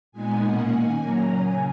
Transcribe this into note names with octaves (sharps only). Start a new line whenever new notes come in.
A#2 G#3 B3 D#4 G#5
B2 A#3 C#4 F#5
D#3 A#3 D#4 G#5
A#2 F#3 A#3 C#4 A#5
C#3 F#3 C#4 G#5